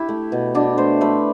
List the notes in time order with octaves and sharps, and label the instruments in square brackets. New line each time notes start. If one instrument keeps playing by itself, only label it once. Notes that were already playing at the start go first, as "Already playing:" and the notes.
Already playing: [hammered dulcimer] E4 G4
A3
B2
B2 D4
A3 C5
A3 B4